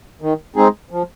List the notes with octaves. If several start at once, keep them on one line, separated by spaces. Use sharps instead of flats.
D#3
G#3 C4 D#4 G#4
F3